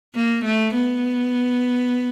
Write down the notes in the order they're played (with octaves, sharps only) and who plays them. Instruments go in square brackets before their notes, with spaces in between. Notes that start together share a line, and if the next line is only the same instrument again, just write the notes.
[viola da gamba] A#3
A3
B3